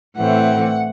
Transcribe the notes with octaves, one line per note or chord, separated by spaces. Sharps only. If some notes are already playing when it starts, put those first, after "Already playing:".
A2 E3 A3 C4 F#5